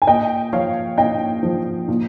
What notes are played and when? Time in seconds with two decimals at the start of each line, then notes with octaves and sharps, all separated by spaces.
0.02 G#5
0.07 A#2 D#5 G5
0.53 F3 C#5 F5
0.98 A#2 D#5 G5
1.43 F3
1.88 A#2